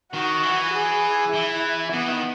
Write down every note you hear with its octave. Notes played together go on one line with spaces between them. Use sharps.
D#3 F#4
E3
G#4
E3 E4
E3 B3
D#3